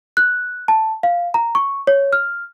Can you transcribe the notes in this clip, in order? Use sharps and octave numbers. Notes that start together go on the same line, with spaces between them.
F#6
A5
F5
A#5
C#6
C#5
F6